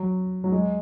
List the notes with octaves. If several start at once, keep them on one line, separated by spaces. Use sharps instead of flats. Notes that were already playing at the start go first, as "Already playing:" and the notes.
Already playing: F#3
F#3
G#3